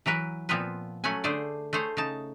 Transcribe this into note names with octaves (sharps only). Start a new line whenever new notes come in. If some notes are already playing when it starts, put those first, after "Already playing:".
E3 F#3 A#4 B4
A#2 F3 B3 C4 F4 B4
F#3 A3 C#4 F#5 G#5
D3 A3 G#4 C5 D5
A3 G#4 C5 C#5
C#3 D#4 A5